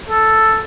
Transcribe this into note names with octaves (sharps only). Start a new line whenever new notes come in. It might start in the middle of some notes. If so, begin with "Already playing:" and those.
A4